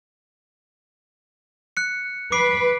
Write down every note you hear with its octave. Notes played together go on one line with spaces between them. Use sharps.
F#6 C#7
B4 D6 C7 D7